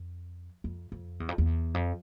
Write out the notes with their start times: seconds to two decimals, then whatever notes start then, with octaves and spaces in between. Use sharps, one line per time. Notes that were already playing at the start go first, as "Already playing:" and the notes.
Already playing: F2
0.64 F2
0.92 F2
1.20 E2
1.29 F2
1.38 E2
1.74 F2